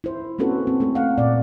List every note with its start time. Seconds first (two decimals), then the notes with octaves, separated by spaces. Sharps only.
0.04 E4 C5
0.39 A#3 C4 C#4 F#4 A4 B4
0.67 C4
0.80 A3 C4 A4
0.95 F5 F#5
1.18 A#2 D5